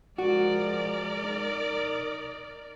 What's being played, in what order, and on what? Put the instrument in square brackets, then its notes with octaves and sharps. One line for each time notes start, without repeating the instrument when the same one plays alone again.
[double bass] F3 G#3 [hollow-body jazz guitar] F#4 [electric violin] A#4 D5
[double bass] D#4